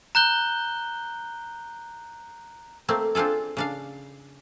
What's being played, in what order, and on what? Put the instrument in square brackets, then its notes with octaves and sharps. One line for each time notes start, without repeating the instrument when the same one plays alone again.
[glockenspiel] A#5 F#6 G6 G7
[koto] A3 A#3 C4
C4 D4 F4 G#4 A4
C#3 D4 F5